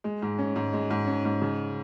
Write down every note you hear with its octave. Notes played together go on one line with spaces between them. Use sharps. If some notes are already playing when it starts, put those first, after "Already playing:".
G#3
G#2
C#4
G#2
G#3
G#2
C#4
G#2
C#3